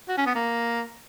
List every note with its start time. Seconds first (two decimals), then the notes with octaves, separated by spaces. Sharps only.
0.08 F#4
0.17 C#4
0.26 B3
0.35 A#3